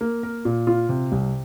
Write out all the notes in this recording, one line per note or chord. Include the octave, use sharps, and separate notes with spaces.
A#3
A#4
A#2
F4
C3
C2